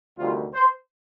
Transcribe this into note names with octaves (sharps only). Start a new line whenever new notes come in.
D2 C3 D#3 G3 F4
C5